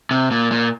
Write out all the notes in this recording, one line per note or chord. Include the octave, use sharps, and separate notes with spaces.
C3
A#2
A#2